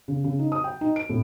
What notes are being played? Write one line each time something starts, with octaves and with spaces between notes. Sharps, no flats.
C#3
C#3
D#4
D#6
G5
D#4
D7
A2